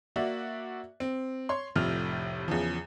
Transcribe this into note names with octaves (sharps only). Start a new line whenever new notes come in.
A#3 F#4 D5 E5
C4
C#5 C6
F1 A2 C3 F3 A3 F6
E2 C#3 F3